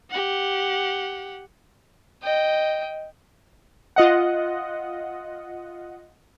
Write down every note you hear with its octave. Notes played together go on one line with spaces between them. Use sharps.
G4 F#5
D#5 G5
F4 D#5 F#5